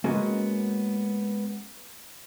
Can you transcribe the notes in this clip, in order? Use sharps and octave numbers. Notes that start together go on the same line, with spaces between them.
G#3 A#3 B3 C#4 F#4